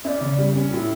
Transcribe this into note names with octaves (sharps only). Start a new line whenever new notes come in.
C#4 D5 E5
C#3
G3
C#4
A2 E4 F#4